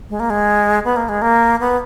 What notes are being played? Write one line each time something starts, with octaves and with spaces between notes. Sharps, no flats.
G#3
A#3
G#3
B3
A#3
G#3
A#3
B3